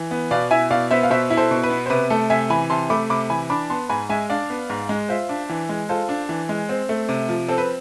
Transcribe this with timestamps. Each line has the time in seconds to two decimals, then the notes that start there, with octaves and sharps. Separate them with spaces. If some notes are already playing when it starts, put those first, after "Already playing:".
Already playing: E3
0.11 B3
0.31 B2 D5 F5
0.51 E4 E5 G#5
0.70 B2 D5 F5
0.91 B3 C5 E5
1.03 F5
1.10 B2 C5 E5
1.30 E4
1.37 A4 C5
1.51 B2
1.63 B4
1.70 B3
1.86 C5
1.90 C3 B4
2.10 A3 A4
2.30 C3 E5 G#5
2.50 E3 G#5 B5
2.70 C3 A5 C6
2.90 A3 B5 D6
3.10 C3 B5 D6
3.30 E3 G#5 B5
3.50 D4 B5 D6
3.70 B3 A5 C6
3.89 G#2 G#5 B5
4.09 G#3 E5 G#5
4.30 D4 D5 F5
4.50 B3
4.70 G#2
4.89 G#3
5.09 F4 C5 E5
5.29 D4
5.49 E3
5.69 G#3
5.89 F4 A4 C5
6.09 D4
6.29 E3
6.49 G#3
6.69 C4
6.89 A3
7.09 C3
7.29 F3
7.48 C4 A4
7.58 B4